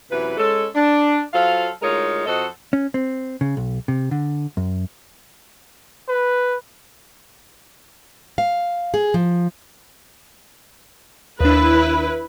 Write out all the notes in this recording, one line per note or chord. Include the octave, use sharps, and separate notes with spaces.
F#2 C3 E3 B4
G#3 C#4 A4
D4
F#3 F4 A4 C5 F5
D2 G#3 D#4 F4 A#4 C#5
F2 F#4 A4 C5 D#5
C#4
C4
C#3
B1
C3
D3
F#2
B4
F5
G#4
F3
D#2 D4 E4 B4